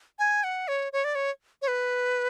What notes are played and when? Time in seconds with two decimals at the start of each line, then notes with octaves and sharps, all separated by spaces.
0.19 G#5
0.44 F#5
0.68 C#5
0.93 C#5
1.04 D5
1.15 C#5
1.62 C#5
1.68 B4